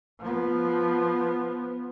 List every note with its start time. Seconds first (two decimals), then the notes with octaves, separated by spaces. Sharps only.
0.20 F3 B3